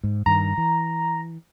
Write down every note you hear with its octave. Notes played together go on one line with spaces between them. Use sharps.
G#2
G2 D#3 A#5
E3